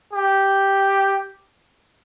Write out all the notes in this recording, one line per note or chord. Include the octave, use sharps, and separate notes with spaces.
G4